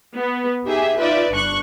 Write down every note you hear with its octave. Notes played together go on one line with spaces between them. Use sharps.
B3
D#4 G4 G#4 E5
D#4 F4 B4 D5 E5
G1 D4 C#6 F#6